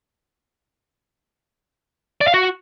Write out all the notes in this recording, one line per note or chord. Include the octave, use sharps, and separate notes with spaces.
D5
F5
F#4